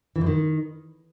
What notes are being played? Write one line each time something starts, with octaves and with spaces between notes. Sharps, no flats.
E3
F#2
D#3